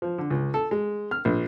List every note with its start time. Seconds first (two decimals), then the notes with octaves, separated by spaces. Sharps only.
0.02 F3
0.18 D3
0.30 C#2
0.54 A4
0.71 G#3
1.11 F6
1.25 A#1